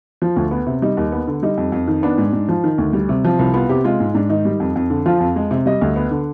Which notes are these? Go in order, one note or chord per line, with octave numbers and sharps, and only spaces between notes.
F3
D2
B3
C3
G3 D#4
D#2
B3
D3
G3 D#4
F2
F2
D#3
B3 D4
G#2
G#2
F3
D#3
D2
G3
C3
F3
C2
B3 F4
C3 G4
G#3 F4
G#2
G#2 D4
D#3 D#4
G3
F2
F2
D3
F3 F4
F2
G#3
C3
G3 D#5
D2
B3
D3